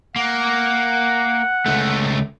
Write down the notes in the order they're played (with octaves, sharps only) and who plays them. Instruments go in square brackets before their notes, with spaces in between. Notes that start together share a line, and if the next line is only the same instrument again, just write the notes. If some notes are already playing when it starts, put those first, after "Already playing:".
[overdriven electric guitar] A#3 [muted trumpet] F#5
[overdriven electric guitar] C#2 A3